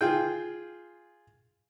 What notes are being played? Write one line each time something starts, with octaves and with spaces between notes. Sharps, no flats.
F4 G#4 G5